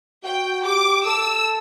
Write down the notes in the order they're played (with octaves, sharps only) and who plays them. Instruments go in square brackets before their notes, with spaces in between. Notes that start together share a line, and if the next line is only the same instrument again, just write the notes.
[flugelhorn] F#4 [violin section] G5
[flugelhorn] G4 [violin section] D6
[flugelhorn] A4 [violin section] E6